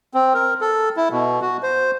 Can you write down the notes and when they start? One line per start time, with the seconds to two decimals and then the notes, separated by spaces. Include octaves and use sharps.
0.14 C4
0.34 A#4
0.61 A4
0.97 E4
1.11 B2
1.42 F#4
1.63 C5